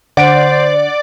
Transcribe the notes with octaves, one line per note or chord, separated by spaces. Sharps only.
D3 C5 D5 F#5 D7